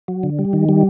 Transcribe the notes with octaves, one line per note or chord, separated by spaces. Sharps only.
F#3
D3
G3
D#3
G3